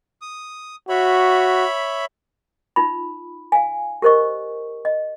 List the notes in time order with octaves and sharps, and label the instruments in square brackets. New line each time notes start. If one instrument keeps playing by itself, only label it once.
[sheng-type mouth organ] D#6
[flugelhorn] F#4 [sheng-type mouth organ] C#5 E5 B5
[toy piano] D#4 F4 B5
F5 G#5
G4 A#4 C5 D#5 C#6
D#5